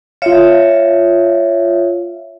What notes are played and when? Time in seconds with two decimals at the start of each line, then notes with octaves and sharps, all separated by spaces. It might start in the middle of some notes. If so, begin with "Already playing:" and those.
0.22 F4 C#5 E5 F5